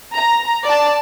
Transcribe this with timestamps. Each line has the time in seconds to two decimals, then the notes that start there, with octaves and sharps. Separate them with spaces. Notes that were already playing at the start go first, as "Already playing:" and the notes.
0.14 A#5
0.64 D5 A5